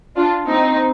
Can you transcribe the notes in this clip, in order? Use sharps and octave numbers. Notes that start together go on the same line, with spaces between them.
D4 F4
C4 D#4